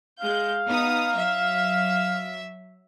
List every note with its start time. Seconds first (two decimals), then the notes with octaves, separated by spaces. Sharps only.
0.20 G#3 F5 G6
0.67 B3 D#4 D#6
1.15 F#3 E5